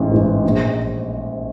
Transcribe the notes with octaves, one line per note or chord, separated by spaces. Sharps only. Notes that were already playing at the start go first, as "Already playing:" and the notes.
Already playing: A1 G#2 E3
G#2 E3
A#1